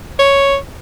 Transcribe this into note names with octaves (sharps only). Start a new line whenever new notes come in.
C#5